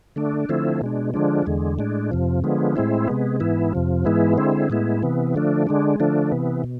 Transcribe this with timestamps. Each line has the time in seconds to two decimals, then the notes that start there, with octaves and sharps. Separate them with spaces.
0.16 D3 A3 D4
0.49 D3 F3 A3 C4 E4
0.81 B2 G#3 D4
1.14 D3 F3 G#3 D4
1.46 E2 D3 G#3
1.79 A2 G#3 D4
2.11 F2 C3 F3
2.44 D3 F3 G#3 B3
2.76 A2 G#3 C4 E4
3.08 C3 G#3 B3
3.40 G#2 E3 B3 E4
3.73 F2 C3 F3
4.05 G#2 E3 G#3 B3 E4
4.38 D3 G#3 C4 E4
4.70 A2 G#3 B3 E4
5.03 C3 E3 B3
5.34 D3 F3 A3 D4
5.67 D3 G#3 D4
6.00 D3 F3 A3 D4
6.32 C3 E3 B3
6.64 B2